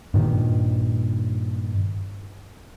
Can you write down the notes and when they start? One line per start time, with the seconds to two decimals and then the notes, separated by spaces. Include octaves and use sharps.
0.14 G2 A#2 D#3